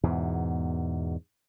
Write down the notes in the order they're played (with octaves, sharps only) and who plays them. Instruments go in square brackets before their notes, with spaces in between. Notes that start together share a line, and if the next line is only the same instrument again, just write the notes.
[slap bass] E2 G#2 B2